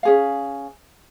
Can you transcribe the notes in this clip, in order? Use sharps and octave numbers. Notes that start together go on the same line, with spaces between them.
C#4 G#4 F5